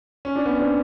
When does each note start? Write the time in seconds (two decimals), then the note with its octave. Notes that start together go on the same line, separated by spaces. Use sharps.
0.25 C#4
0.36 D4
0.46 B3 C#4
0.58 C4 D4